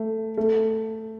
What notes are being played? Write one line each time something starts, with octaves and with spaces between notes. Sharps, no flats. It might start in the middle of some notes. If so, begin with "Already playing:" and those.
Already playing: A3
A3